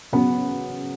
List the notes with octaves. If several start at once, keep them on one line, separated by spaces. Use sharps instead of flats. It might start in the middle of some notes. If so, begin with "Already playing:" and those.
C#3 F#3 B3 C#4 F#4